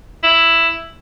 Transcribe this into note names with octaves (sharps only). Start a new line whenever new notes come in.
E4